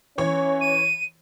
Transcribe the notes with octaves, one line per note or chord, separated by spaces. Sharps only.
E3 C#4 C#5
D#7